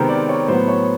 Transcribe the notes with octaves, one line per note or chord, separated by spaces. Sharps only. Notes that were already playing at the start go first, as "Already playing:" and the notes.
Already playing: C3 D#3 G#3 B3 A#4 C5
D5
C#5
A2 F#3 B3 C5
C#5